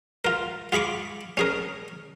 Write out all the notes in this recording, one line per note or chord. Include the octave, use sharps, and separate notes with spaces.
F4 A#4
F4 G#4 B5 C#6 D6
C#4 G#4 A#4